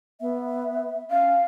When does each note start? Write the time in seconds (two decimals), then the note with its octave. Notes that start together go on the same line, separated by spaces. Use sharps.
0.21 B3 E5
1.10 C#4 F5